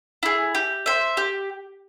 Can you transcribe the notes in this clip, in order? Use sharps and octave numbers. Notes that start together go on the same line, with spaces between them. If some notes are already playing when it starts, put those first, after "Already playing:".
E4 G#4
G4
C5 E5
G4